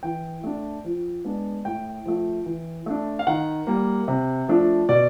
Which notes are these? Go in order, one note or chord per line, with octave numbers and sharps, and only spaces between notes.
E3 G5
A3 D4
F3
G#3 B3 D4
A2 G5
F3 A3
E3
A3 D4
F5
D#3 F#5
G3 A#3
C3
F3 A3 D4
B2 D5